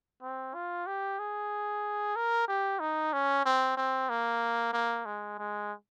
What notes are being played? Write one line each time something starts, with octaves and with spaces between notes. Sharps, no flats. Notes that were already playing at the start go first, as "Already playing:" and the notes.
C4
F4
G4
G#4
A#4
G4
D#4
C#4
C4
C4
A#3
A#3
G#3
G#3